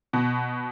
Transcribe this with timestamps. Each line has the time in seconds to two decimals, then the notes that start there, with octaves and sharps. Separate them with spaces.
0.13 B2